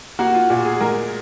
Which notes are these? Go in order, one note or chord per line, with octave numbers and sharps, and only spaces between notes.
A#3 F#4
F4
A#2 F#4
G#4
G#3 A#4